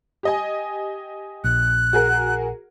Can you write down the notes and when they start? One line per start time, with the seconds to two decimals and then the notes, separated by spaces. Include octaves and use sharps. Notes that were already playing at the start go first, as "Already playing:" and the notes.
0.23 G4 D#5 G#5
1.44 A#1 F#6
1.93 F#4 G#4 A#4